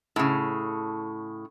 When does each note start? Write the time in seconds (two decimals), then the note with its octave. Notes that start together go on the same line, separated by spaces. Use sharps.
0.16 A2 C#3